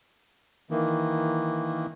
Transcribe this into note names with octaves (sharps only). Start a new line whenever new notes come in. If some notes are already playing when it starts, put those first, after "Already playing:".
D#3 E3 A#3